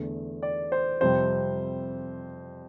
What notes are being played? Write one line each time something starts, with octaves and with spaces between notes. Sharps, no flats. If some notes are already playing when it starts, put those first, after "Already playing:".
Already playing: E2 D3 A3
D5
C5
F2 C3 G3 C5